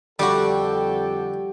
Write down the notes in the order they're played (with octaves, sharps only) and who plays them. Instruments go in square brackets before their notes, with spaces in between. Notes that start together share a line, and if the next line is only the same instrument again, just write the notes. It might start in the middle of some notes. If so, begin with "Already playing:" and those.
[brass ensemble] F2 A4 G5 [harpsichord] D3 G4 [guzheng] G3 F#4